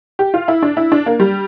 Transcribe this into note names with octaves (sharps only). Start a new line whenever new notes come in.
G4
F4
E4
D4
E4
D4
A#3
G3